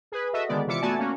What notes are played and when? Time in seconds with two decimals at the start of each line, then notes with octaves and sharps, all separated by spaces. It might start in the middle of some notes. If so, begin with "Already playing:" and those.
0.12 G#4 B4
0.33 F#4 A4 D#5 E5
0.48 D3 D#3 G#3 B3 D5
0.66 C3 E3 F4 E5 D6 C#7
0.81 A3 B3 F#4 D5 G#5 A5
0.97 A#3 C#4 F#4